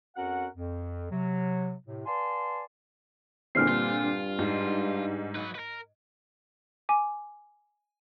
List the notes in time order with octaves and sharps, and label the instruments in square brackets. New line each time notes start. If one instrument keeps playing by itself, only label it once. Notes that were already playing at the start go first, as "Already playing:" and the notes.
[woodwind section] F2 C#4 F#4 A#4 F#5
F2
C3 F#3
A2 C3
B4 D5 F5 G#5 A5 C6
[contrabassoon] E2 [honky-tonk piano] A#2 D3 C4 [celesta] F6 C7
[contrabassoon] G2 [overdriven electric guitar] F4
[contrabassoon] G2
[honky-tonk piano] G#2
[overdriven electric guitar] F#3 B4
A#4 B4
[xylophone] G#5 D6